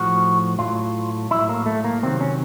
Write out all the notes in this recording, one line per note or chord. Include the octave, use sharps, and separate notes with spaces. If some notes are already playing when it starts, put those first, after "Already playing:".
Already playing: A2 F3 F#4
A2 F#3 F4
A2 F#3 E4
A#3
A3
A#3
C3 D#3 F#3 C4
C#4